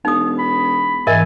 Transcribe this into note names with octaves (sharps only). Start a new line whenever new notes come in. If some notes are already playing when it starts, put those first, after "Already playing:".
E1 D#4 D#6
B5
G#2 E3 A#4 D#5 E5 G#5